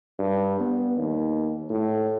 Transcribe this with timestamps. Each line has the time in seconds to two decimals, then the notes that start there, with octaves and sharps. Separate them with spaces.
0.19 G2
0.60 B3
0.97 D#2
1.70 A2